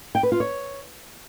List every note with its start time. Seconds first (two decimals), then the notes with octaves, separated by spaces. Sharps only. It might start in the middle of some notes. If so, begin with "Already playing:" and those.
0.15 G5
0.23 B4
0.32 F4
0.40 C#5